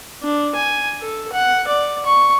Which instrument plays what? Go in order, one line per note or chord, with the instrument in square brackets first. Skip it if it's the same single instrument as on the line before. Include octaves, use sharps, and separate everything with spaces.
[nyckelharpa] D4
G#5
A4
F#5
D5
C#6